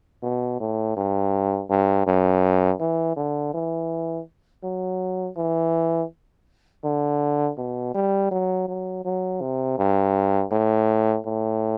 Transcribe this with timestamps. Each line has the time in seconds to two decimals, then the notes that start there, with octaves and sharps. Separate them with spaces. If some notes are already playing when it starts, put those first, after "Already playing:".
0.23 B2
0.60 A2
0.97 G2
1.70 G2
2.07 F#2
2.80 E3
3.17 D3
3.54 E3
4.64 F#3
5.37 E3
6.84 D3
7.58 B2
7.94 G3
8.31 F#3
8.68 F#3
9.05 F#3
9.41 C3
9.78 G2
10.52 A2
11.26 A2